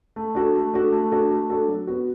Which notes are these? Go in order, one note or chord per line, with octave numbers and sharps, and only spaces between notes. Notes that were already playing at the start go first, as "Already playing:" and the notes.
A3
D4 F#4 A4
A3
D4 F#4 A4
A3
D4 F#4 A4
A3
D4 F#4 A4
F#3
B3 F#4